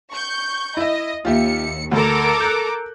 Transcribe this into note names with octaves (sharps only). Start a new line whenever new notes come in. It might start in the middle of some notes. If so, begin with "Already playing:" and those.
C#6 G6
E4 D#5 E5
D#2 F4 G4 E5 C#7
D2 A4 A#4 D6
F#6 G6